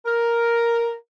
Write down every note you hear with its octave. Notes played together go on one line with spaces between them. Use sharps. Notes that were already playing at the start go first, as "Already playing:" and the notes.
A#4